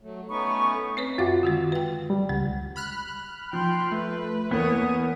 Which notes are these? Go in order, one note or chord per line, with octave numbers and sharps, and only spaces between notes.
F#3 A3
A3 B3 C#4 D#4 C#6
C4 B4 C#5
F#2 F4 F#4 E5 D6
D3 D#3 G#3
B4 G5
G3
C#2 G#3
B5 F6 F#6
F3 G5 C6
A3 B4
E2 A#3 B3 C#5 D#6